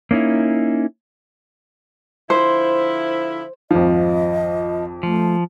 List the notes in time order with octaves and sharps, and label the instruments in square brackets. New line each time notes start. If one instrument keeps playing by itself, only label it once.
[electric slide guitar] A#3 C#4 D#4 E4
[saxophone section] D3 F3 E4 [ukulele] C5
[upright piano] G#1 F2 [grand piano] F3 [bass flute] D#5
[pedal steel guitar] F3 [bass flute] A3